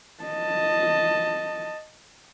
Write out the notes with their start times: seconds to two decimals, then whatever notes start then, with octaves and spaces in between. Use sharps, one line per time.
0.23 D#5 A5